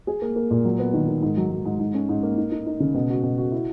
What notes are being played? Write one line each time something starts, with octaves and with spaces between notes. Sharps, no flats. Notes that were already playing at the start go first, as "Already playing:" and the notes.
G#4
A#3
A#3
A#2
F#3
B3
D#3
D#3
G#2
F#3
F#3
G#2
G#2
C#4
G#2
A#3
D#4
D#4
D#4
C#3
B2
F#4
B2
F#4
E4